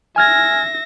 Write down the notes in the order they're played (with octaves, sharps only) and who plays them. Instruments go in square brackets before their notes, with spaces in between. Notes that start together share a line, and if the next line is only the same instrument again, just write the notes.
[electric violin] E5 A#6 [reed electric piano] G#5 F6 G#6